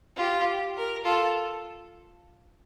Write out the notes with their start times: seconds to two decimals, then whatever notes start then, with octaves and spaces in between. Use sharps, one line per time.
0.17 F4 G4
0.76 A#4
1.05 F4 A4